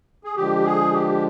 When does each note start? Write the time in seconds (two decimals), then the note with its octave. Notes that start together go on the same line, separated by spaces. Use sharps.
0.24 G#4
0.36 D3 F3 G#3 G4
0.65 G#4
0.93 G4